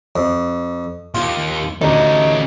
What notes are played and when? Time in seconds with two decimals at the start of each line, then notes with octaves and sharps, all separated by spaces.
0.16 F2
1.15 D#2 F4
1.82 D2 C#4 D#4 A4